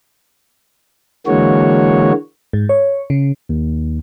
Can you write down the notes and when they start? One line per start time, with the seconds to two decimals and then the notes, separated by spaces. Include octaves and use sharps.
1.27 D3 E3 G#3 A#3 F#4 C#5
2.53 G#2
2.69 C#5
3.10 C#3
3.49 D#2